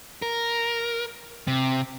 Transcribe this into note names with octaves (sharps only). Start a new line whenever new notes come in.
A#4
C3